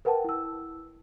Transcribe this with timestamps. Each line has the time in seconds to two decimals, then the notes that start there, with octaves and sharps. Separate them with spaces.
0.05 A#4 B4 F#5 G5 A5
0.24 E4 E6